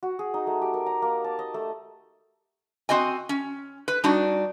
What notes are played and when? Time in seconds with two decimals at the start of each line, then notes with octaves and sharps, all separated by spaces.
0.03 F#4
0.19 G#4
0.34 D#4
0.47 A3
0.62 G4
0.74 A#4
0.86 A#5
1.02 A#3
1.24 A5
1.39 D#5
1.54 A3
2.89 C4 F#4 D#5 G#5
3.29 C#4
3.88 B4
4.04 G3 D4 D#4 F#4